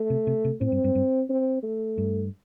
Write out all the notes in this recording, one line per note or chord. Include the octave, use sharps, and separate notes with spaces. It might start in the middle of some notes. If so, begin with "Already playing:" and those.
Already playing: A3
C3
C3
C3
A2 C4
G2
G2
G2
C4
A3
G2